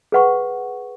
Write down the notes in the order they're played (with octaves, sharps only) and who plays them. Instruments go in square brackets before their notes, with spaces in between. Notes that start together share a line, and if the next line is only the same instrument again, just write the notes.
[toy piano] G#4 B4 F#5 C#6